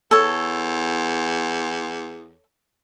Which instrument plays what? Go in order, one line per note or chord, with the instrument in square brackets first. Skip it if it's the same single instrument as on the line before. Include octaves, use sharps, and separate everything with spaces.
[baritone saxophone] E2 [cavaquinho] A4 C#5